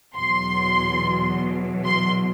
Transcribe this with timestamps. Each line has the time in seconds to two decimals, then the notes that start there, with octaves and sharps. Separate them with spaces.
0.15 E2 B2 F#3 C6
1.85 C6